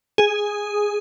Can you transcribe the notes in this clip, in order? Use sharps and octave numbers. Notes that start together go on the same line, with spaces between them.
G#4